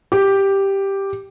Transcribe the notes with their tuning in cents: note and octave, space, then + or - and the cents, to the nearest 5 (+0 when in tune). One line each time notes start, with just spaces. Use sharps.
G4 +0